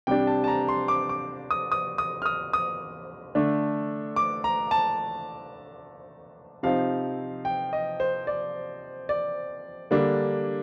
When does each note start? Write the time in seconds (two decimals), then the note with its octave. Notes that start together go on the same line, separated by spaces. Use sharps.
0.07 C3 G3 D4 G5
0.27 A5
0.44 A5
0.48 A#5
0.68 C6
0.88 D6
1.09 D6
1.51 D#6
1.72 D#6
1.98 D#6
2.22 F6
2.26 D#6
2.53 D#6
3.35 D3 A3 D4
4.16 D6
4.44 A#5
4.71 A5
6.63 C3 F3 C4 D#4 F5
7.45 G5
7.73 D#5
8.00 C5
8.27 D5
9.09 D5
9.91 D3 G3 A#3 D4